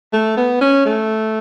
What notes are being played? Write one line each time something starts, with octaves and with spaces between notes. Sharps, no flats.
A3
B3
C#4
A3